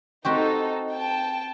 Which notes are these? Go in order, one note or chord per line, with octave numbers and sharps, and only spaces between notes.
C4 D#4 F#4 G4 A4
G5 A5